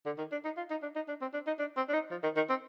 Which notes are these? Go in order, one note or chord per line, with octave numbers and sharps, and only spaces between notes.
D3
D#3
D4
D#4
F4
D#4
D4
D#4
D4
C4
D4
D#4
D4
C4
D4
D#4
F3
D#3
D#3
C4